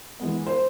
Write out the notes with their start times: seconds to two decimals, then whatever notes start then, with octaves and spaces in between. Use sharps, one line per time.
0.20 E3 G#3 B3
0.47 C5